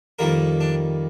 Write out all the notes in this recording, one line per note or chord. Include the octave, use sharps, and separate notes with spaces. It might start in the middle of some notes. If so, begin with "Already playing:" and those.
F2 D#3 G3 A#3 A#4
D4